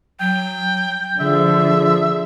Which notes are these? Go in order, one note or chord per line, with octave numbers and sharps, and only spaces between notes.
F#3 G5
D3 F3 G#4 E5